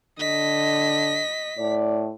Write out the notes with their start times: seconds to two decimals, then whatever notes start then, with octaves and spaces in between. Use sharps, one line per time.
0.20 D3 D#5 B6
1.59 A2 D5